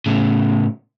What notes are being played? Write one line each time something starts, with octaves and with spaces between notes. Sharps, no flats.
A2 C#3